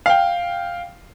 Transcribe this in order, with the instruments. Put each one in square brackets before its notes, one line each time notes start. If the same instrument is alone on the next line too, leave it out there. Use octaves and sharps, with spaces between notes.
[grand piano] F5 G5